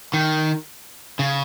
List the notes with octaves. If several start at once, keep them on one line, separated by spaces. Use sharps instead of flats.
D#3
C#3